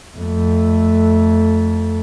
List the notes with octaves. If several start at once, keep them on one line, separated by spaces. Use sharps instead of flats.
F2 A3